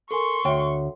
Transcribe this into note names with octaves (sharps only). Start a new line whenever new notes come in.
A4 A#4 G#5 C6 C#6
D2 C#5 E5 G5